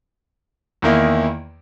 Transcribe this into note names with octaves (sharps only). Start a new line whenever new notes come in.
E2 D#3 A#3 E4